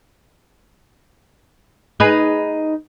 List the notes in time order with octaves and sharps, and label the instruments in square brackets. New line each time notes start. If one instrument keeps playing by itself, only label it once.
[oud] D#4 G#4 B4